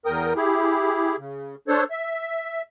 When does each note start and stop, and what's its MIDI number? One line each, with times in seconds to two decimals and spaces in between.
0.06 0.34 40
0.06 0.34 70
0.06 0.34 79
0.06 0.34 87
0.36 1.16 64
0.36 1.16 67
0.36 1.16 68
1.18 1.56 49
1.68 1.84 62
1.68 1.84 69
1.68 1.84 72
1.68 1.84 73
1.91 2.62 76